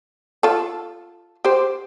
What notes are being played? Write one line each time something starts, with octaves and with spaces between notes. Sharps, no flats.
F4 A4
G4 C5